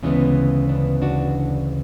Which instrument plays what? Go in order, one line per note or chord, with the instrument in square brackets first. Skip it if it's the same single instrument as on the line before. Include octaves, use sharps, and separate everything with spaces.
[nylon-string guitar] D2 C#3 E3 G#3 B3 C#4
B3 D4
D4 F#4